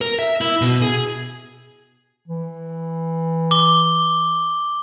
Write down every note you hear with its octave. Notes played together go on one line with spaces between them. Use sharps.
A#4
E5
E4
B2
G#4
E3
D6 G7